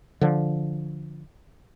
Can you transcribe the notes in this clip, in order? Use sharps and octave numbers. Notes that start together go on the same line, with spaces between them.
D3 F3